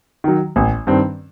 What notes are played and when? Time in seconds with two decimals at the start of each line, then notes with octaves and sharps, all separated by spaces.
0.24 D#3 F#3
0.56 A1
0.87 G2 D#3 G3 C4